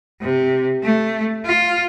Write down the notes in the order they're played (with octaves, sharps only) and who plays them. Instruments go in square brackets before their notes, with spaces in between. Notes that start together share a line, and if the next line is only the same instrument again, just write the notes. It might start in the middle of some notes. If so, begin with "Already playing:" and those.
[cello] C3
A3
F4